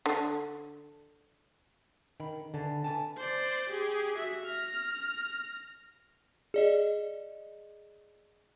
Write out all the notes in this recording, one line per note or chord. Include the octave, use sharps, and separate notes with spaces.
D3
D#3 A#4 B5
D3 E3 A5
E3 G#5 A5
C5 D5
G4 G#4
F#4 E5
F6 A#6
G#4 D5 D#5